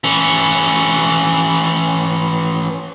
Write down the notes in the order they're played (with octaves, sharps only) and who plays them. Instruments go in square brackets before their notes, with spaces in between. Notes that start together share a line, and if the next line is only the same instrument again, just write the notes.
[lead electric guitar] E3 C#4